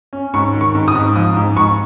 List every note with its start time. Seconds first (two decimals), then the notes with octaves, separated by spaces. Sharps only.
0.13 C#4
0.34 G#2 C#6
0.54 D#3
0.61 C#6
0.75 G#2
0.88 D#6
0.95 G#2
1.16 F3 D#6
1.36 G#2
1.56 G#2 C#6